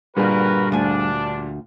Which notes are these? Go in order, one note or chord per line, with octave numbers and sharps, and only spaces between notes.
G2 A#2 D3 G3 F#4 G#4 A#4 B4
D2 D4 G#5